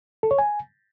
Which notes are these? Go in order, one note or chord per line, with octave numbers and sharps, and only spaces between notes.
A4
C#5
G#5